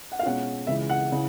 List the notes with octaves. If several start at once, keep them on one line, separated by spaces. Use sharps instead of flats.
F#5
F5
B2 G#3 C#4 F4 F#5
C#2 C#3 E3 G#3 E5
F#5
C#3 E3